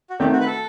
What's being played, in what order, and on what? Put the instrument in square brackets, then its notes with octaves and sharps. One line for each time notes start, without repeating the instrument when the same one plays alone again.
[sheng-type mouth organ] F#4
[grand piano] D#3 A3 C4 [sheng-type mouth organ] G4
[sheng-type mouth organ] F#4
B4
A4